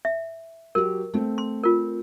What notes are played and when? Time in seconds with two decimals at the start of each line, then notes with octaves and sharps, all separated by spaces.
0.05 E5
0.75 F#3 G4 A#4
1.14 A3 C4
1.38 C6
1.64 F4 A#4